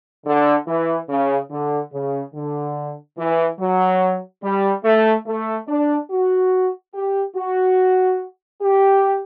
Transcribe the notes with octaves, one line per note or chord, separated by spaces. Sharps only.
D3
E3
C#3
D3
C#3
D3
E3
F#3
G3
A3
A3
D4
F#4
G4
F#4
G4